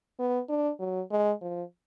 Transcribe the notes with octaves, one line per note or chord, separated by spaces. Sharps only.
B3
D4
F#3
G#3
F3